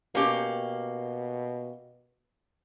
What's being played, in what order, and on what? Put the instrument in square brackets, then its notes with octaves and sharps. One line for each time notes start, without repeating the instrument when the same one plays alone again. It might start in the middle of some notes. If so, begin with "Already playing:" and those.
[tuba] B2 [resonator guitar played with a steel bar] A#3 C#4 G4